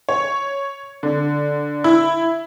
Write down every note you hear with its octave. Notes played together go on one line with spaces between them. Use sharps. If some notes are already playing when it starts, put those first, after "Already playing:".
C#5
D3
E4